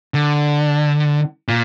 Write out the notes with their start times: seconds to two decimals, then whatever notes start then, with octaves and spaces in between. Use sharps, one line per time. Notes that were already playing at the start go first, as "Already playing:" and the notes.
0.14 D3
1.48 A#2